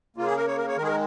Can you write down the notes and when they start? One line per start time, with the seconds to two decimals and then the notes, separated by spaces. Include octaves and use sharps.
0.16 C#3 A#3 F4
0.27 G#4
0.37 A#4
0.47 C#5
0.57 A#4
0.68 C#5
0.77 D#3 A#4
0.81 G#3 G#4
0.87 A#4